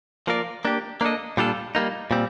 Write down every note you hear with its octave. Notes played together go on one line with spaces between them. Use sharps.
F3 A#3 F4 A#4 D5
A#3 D4 G4
A#3 D4 A4 D#5
A#2 G3 D4 F4 A4
G3 A#3 D#4
A#2 G3 C4